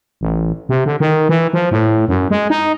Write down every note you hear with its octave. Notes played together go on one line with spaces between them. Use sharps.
A1
C3
D3
D#3
E3
F3
A2
F#2
G#3
D#4